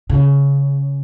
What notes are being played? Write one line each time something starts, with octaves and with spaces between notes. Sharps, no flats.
C#3